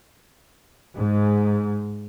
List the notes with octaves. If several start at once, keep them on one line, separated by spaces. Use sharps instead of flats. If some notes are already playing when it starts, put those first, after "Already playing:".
G#2